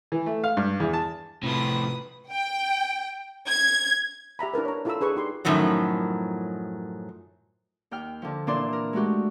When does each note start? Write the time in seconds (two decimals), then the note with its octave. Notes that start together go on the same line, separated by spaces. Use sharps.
0.12 E3
0.26 A3
0.44 F5
0.57 G2
0.80 E2
0.93 A5
1.43 A2 C3 F3 B4 D#6
2.30 G5
3.48 G#6
4.39 G4 E5 A#5 B5
4.54 D4 E4 A#4 B4
4.65 C#5 A#5
4.85 E4 F4 A4 A#5 B5 E6
5.01 D4 G#4 B4 C#6
5.16 D#4 G4 C6
5.45 F#2 A2 D#3 F3 F#3
7.91 D#2 G5 F6
8.22 D3 F3
8.47 A#2 E3 D4 D5 C6
8.73 A#4
8.93 G#3 A3 F#4 G4